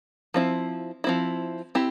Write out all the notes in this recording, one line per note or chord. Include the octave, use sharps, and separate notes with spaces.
F3 C4 E4
F3 C4 E4
C4 E4 G4